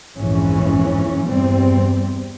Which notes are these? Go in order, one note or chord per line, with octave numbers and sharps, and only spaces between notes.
A#1 F2 G#2 E3 C#4
E2 G2 G3 C4